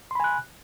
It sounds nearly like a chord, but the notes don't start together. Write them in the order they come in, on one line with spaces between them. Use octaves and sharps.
C6 B5 G#5 F#6